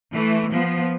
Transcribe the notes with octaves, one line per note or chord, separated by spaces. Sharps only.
E3 A3
F3 B3